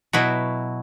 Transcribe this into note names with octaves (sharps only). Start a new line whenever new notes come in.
B2 F#3 E4